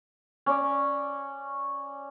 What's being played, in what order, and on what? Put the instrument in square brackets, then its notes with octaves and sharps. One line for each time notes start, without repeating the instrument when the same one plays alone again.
[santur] C#4 D5